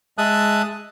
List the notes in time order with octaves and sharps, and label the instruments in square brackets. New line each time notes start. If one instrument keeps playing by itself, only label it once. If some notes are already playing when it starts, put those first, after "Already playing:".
[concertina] G#3 E5 A5 D#6 F#6